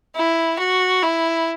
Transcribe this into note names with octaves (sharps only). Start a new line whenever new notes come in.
E4
F#4
E4